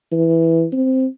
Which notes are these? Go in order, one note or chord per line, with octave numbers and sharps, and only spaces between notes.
E3
C4